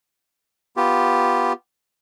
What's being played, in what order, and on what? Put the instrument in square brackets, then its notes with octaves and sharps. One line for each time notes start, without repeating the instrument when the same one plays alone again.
[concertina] B3 F4 G4